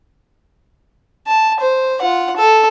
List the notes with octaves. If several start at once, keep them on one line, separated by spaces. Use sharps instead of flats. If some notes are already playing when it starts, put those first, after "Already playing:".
A5
C5
F4 F#5
A4